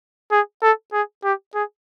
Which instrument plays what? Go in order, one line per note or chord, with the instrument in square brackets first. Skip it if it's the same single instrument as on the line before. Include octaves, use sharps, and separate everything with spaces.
[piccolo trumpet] G#4
A4
G#4
G4
G#4